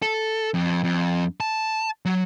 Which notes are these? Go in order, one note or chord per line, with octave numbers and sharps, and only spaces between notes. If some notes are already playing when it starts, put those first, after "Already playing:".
A4
F2
F2
A5
F#3